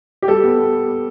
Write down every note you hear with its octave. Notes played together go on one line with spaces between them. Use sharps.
G4
G3 A4
B3